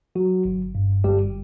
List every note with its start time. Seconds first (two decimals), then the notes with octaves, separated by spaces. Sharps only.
0.15 F#3 F#4
0.45 G1
0.75 G2
1.04 G1 G3 G4